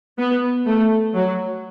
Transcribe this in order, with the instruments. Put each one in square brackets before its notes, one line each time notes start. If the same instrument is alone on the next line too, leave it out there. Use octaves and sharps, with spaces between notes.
[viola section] B3
A3
F#3